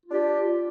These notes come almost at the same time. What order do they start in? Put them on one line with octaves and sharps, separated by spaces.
F4 D4 G4